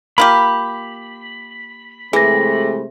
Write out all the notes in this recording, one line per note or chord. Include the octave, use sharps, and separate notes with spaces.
A#3 F4 G4 B5
C3 E3 G#3 A3 G#4 A#6